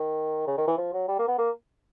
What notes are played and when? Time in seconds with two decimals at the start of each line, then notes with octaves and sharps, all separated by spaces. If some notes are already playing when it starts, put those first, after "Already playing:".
Already playing: D#3
0.47 C#3
0.57 D#3
0.67 E3
0.78 F3
0.93 F#3
1.08 G3
1.19 A#3
1.28 B3
1.38 A#3